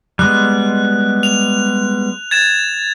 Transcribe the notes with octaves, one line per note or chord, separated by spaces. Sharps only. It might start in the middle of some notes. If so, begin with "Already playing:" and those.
G3 G#3 B3 F#6
F7
G#6 A6 E7